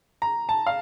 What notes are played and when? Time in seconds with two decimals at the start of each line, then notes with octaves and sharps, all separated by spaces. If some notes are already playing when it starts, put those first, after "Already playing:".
0.22 A#5
0.49 A5
0.67 F5